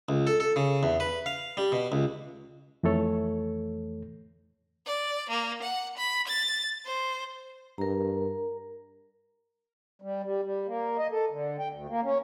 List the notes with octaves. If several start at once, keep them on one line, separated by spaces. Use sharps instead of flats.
C#2
A4
A4
C#3
E2
B4
F5
G3
B2
C#2
F2 E3 A3 A4 C#5
D5
A#3
F#5
B5
A6
C5
G2 A#4 A#5
G3
G3
G3
A#3
D#5
A4
D3
G5
D2
A#3
C#4